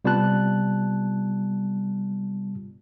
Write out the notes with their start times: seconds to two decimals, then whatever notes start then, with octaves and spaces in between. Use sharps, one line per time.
0.05 C3 G3 B3 F4 A5 F#6